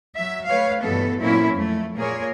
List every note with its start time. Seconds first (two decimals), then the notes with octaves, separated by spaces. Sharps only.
0.16 F#3 E5
0.46 A3 B4 C#5 F5
0.82 G2 B2 E3 B3 A4
1.21 A#2 F#3 A#3 C4 C#4 E4
1.54 F2 A3
1.96 A#2 A#3 G#4 A#4 C#5